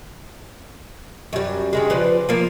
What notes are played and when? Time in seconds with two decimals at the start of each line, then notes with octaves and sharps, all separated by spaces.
1.33 F#2 G3
1.73 G2 C#3 G#3
1.90 F3 B4 D5
2.29 F3 A#3